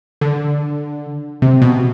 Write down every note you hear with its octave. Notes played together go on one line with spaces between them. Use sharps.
D3
C3
B2